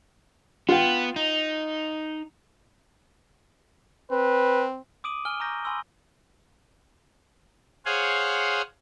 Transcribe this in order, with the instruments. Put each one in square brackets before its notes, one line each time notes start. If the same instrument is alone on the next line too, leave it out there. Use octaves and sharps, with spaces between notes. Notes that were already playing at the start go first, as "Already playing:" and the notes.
[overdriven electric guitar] B3 [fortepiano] F4 F#5 G5
[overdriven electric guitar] D#4
[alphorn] C4 [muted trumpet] B4
[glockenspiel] D6 D#6 D7 D#7 F#7
G#5 F6 D7 G7
A#5 C#6 E6 F6 G6 A#6
G#5 B5 C6 E6 G7
[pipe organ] G#4 C5 C#5 F5 F#5 G#5